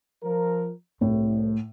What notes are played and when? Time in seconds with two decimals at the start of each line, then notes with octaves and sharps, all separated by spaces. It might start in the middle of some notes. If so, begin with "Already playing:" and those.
0.24 F3 A#4
1.01 C2 A2